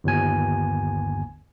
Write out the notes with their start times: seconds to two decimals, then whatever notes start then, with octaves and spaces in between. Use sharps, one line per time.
0.04 G1 D#2 G#5